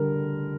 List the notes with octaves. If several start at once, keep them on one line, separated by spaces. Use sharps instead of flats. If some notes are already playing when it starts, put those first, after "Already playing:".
Already playing: D3 G3 A#4